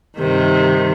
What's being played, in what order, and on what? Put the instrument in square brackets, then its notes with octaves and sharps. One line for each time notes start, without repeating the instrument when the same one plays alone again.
[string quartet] G2 C3 D#3